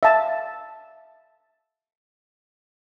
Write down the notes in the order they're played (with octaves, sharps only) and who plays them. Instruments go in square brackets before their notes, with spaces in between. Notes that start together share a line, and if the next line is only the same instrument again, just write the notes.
[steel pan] E5 F5 A5